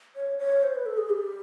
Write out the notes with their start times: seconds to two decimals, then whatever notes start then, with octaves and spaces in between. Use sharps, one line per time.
0.16 C#5
0.39 C#5
0.63 C5
0.75 B4
0.86 A4
0.98 G#4
1.10 G4